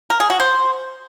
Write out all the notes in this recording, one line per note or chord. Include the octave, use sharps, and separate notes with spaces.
A#4
G#4
F#4
C5